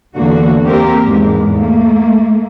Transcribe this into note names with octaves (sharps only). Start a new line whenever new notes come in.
E2 D3 A#3 F#4
A#3 C4 G4 A#4
E2 G#2 G#3
A3 A#3